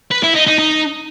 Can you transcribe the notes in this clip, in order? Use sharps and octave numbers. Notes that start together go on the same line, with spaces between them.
B4
E4
D#4
D#4
D#4